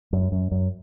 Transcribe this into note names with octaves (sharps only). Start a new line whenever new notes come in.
F#2
F#2
F#2